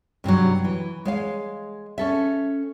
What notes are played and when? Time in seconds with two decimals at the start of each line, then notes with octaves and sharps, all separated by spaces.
0.24 G2 C3 F3 F#3
0.64 E3
1.05 G#3 C#5 F5
1.98 C#4 A4 E5